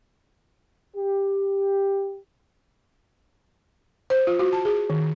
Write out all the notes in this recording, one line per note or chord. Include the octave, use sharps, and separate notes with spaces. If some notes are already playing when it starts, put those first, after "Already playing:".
G4
C5
F4
F#4
A5
G#4
D#3